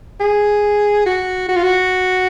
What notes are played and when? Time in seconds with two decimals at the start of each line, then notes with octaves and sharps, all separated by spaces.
0.20 G#4
1.06 F#4
1.48 F#4
1.56 F4
1.63 F#4